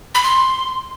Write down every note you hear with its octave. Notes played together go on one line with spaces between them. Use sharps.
B5
C6